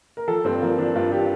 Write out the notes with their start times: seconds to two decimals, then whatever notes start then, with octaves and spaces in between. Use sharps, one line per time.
0.17 A#4
0.28 F3 A4
0.44 G2 C4
0.62 F3 A#3
0.79 F3 D4
0.95 G2 F4
1.12 G4